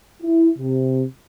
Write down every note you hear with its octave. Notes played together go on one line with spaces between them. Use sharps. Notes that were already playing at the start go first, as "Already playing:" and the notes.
E4
C3